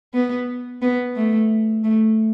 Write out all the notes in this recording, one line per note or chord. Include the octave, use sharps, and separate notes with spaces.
B3
B3
A3
A3